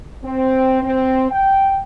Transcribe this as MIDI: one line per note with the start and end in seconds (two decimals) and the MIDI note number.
0.24 0.82 60
0.83 1.29 60
1.32 1.79 79